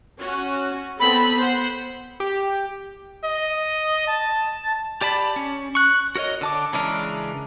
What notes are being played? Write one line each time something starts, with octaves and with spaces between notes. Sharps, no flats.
C#4 F#4
B3 C4 A4 B5
C5 F#5
G4
D#5
A5
G4 D5 A5 B5
C#4
C#6 F#6
F#4 A#4 C#5 D#5
D3 A5 D6
C#3 E3 G#3 D4 A#4